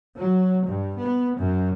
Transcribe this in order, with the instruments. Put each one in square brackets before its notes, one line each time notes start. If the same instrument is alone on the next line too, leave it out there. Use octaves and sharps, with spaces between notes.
[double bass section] F#3
G2
B3
F#2